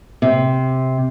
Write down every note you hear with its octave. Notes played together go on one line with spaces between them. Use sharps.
C3